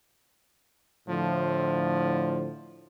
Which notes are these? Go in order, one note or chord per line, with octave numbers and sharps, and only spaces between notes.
A2 D3 F3